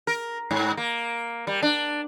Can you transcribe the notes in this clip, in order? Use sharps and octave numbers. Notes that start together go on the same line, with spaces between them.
A#4
G#2
A#3
G3
D4